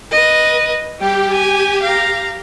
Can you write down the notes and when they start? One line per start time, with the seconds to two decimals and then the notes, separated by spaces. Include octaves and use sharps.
0.11 B4 D#5
0.99 G3 G4 G5
1.32 G#5
1.82 F5 A#5